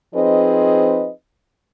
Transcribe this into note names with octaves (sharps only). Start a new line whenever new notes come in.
F3 C4 D#4 G#4 B4 D#5